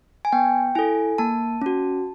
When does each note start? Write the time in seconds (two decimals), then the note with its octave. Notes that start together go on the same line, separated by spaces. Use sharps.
0.25 G#5
0.32 B3 G5
0.75 E4 A4 G#5
1.18 A#3 A5
1.62 C#4 F#4